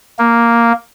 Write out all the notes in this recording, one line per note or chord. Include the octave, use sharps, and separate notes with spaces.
A#3